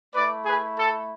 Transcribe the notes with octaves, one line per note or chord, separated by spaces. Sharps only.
A3 E4 B4 D5
G#4 B4
A4